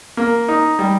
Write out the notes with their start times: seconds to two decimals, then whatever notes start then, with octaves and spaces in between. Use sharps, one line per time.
0.17 A#3
0.48 D#4
0.79 G3